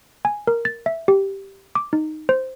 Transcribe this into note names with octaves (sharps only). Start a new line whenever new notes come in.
G#5
A#4
A6
E5
G4
D6
D#4
C5